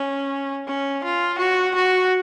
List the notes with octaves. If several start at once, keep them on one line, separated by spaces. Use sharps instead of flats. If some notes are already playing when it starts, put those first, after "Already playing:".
Already playing: C#4
C#4
F4
F#4
F#4